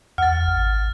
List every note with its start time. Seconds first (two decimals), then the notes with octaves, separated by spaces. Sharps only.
0.18 E2 F#5 F6 A6
0.47 G#1